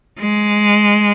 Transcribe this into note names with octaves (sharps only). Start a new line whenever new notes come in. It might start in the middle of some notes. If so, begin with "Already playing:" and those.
G#3